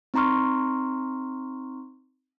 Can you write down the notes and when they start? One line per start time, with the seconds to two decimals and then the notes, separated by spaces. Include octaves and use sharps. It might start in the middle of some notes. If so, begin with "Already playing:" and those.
0.14 C4 D#4 A#5 C6 C#6 F6